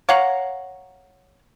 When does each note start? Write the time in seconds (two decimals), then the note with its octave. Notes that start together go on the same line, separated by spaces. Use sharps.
0.09 C#5 F5 F#5 A#5